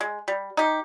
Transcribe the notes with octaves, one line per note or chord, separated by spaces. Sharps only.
G#3
G3
D#4 G4